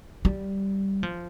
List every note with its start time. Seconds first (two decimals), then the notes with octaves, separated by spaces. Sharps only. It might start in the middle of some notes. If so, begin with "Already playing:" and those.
0.25 G3
1.03 F3